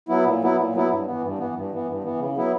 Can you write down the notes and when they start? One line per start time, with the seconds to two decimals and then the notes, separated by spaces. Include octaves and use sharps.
0.09 F#3 B3 E4
0.25 A#2
0.41 F#3 B3 E4
0.58 A#2
0.74 F#3 B3 E4
0.90 G2
1.06 E3 B3
1.23 G2
1.38 E3 B3
1.55 G2
1.71 E3 B3
1.87 G2
2.04 E3 B3
2.19 C#3
2.36 F#3 B3 E4